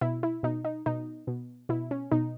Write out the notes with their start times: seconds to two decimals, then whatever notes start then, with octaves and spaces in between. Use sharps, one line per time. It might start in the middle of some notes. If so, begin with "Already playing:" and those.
0.01 B2 E4
0.23 E4
0.43 B2 D#4
0.65 D#4
0.86 B2 D#4
1.27 B2
1.69 B2 E4
1.91 C#4
2.11 B2 D#4